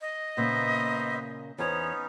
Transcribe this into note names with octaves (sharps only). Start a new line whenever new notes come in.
D#5
A#2 C#3 A#3 B3 C5 E5
E2 B3 C#4 D#4 C5 C#5